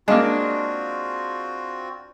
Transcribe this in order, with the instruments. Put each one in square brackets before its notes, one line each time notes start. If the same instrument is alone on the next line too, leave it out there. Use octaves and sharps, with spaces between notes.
[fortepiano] G#3 A#3 [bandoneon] C4 F4 F#4 [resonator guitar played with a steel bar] D4 [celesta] D#5 F5